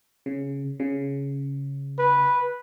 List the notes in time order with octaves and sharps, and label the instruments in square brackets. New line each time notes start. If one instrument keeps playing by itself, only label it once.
[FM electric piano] C#3
C#3
[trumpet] B4